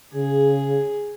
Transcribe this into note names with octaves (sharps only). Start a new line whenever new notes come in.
C#3 G#4